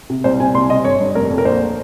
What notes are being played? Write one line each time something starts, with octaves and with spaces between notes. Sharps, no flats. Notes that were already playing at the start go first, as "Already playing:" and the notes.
C3
C2 C5
C3 G#5
C2 C6
C3 D#5
G1 C#5
G2
F1 A#4
F2
A#4
A#1 C5